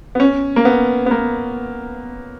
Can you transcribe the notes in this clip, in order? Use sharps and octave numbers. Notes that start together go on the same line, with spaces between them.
B3
C#4
A#3
B3
B3
A#3